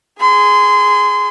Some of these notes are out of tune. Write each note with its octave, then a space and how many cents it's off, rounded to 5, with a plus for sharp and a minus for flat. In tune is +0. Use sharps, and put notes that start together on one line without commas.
G#4 +0 C6 -30